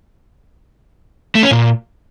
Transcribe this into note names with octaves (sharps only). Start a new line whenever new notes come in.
A3
C#4
A#2